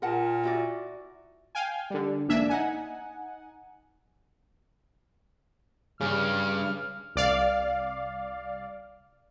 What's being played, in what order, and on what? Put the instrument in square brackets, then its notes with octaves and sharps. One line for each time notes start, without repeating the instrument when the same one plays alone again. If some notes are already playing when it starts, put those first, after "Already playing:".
[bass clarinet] A#2 [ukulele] A#4 F#5 A5
[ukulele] E4 F#4 D5
[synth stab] F5 G5 G#5
D3 G3
A1 G#2 A#3 D4 E5 G#5
D#4 F#5 G#5
[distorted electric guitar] G2 [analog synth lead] C#3 [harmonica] F6
[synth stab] C2 D5 F5